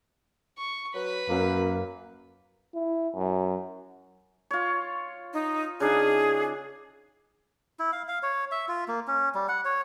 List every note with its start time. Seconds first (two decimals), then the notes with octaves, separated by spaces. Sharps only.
0.58 C#6
0.94 F#3 B4 B5
1.29 F#2 A#3
2.74 E4
3.15 F#2
4.51 F4 C#5
5.33 D#4
5.80 C#3 D4 D#4 G#4
7.79 E4
7.92 F5
8.08 F5
8.23 C#5
8.51 E5
8.69 F4
8.88 A#3
9.08 C#4
9.35 G3
9.49 F#5
9.65 C#5